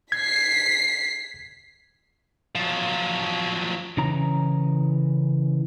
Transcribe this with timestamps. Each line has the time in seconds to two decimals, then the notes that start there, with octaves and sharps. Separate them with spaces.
0.12 G#6 B6 C7
2.55 F3 F#3
3.97 C#3 E3 C#4 A#5